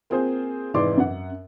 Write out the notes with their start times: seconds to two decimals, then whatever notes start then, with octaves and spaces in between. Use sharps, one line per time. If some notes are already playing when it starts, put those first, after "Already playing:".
0.10 A#3 C4 F4 G#4 C5
0.74 F1 G#2 E3 D5 C6 D6
0.98 F#2 F#5